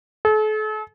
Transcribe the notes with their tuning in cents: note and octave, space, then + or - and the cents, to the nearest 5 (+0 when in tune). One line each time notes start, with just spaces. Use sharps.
A4 -40